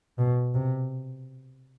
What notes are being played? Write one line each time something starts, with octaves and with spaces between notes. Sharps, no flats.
B2
C3